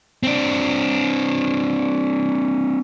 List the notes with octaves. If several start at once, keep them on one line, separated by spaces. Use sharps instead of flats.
C4 D4